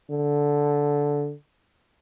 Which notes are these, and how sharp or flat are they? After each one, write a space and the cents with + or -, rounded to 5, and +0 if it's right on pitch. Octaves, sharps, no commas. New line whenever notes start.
D3 -10